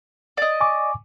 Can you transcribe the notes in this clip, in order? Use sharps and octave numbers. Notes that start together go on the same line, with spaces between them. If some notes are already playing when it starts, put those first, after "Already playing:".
D5 D#5
G#5 C#6 D6